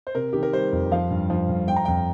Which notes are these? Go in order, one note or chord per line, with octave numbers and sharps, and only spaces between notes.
C5
C3 A#4
D#3 G4
A#4
G3 C5
F2
F3 F5
G2
F3
G2
F3 G5
A#5
G5
F2